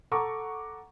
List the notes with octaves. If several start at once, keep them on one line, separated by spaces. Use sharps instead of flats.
A4 F#5 A#5 C#6 D6